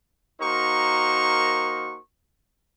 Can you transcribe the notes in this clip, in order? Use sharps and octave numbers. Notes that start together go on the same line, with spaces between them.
A#3 D#4 F#4 A#4 C5 C#6